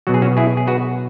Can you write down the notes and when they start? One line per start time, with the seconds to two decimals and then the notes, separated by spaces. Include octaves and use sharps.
0.07 B2 F#3 F#4
0.14 G#4
0.22 C#4 F#4
0.37 E4 G#4
0.57 G#4
0.67 F#4 B4